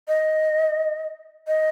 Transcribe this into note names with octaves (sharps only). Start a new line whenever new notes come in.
D#5
D#5